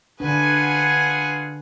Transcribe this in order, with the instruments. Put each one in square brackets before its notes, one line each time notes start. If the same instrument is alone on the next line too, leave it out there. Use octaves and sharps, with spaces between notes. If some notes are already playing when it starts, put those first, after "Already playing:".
[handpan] D3 D4 [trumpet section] F4 G#4 F#5 [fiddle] B4 G#5